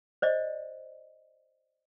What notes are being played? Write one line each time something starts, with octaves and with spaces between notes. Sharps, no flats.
C5 D5 D#5